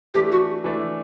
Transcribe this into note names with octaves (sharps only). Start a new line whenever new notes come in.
E3 A3 D4 G4
F#4
E3 A3 D4